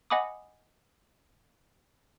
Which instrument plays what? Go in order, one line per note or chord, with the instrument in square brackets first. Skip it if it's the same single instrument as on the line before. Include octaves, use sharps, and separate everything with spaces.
[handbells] D#5 F#5 G#5 B5 D6 D#6